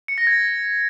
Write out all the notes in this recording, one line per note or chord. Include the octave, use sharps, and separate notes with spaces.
C#7
A#6
G#6